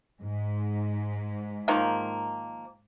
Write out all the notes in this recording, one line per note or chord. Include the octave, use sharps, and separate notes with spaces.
G#2
D#3 F3 A#3